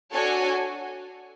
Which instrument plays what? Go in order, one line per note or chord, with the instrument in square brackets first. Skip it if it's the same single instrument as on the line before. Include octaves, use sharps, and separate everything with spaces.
[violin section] D4 F#4 A4 C#5 G#5